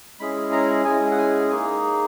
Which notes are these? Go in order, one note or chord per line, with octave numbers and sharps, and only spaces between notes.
G#3 C#4 E4 G#4 B5
A#5
G#3 C#4 E4 G#4 G#5
F#5
G#5
A#3 D#4 G#4 G#5